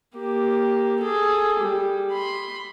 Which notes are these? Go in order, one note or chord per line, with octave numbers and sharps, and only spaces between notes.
A#3 G4
G#4 A4
G3
B5 C6